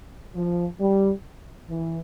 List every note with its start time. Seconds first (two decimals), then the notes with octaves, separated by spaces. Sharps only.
0.35 F3
0.79 G3
1.68 E3